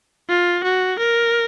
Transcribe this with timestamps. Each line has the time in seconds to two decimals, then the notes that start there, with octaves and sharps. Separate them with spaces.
0.29 F4
0.64 F#4
0.99 A#4